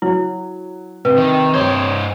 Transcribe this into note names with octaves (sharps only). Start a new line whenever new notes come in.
F#3 E4
C3 B4
D#3
G2 C5 C#5